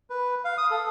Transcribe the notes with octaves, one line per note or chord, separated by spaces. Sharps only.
B4
F5
D#6
A4